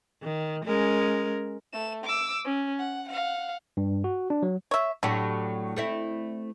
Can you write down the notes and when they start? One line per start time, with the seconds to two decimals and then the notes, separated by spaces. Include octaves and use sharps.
0.22 D#3
0.65 G#3 C#4 A#4
1.73 A3 E7
2.04 D6 E6
2.45 C#4
2.79 F#5
3.09 F5 F#5
3.77 G2
4.04 F#4
4.30 D4
4.43 F#3
4.71 C#5 E5
5.03 A2 D3 F#3 G4
5.76 A3 C4 E4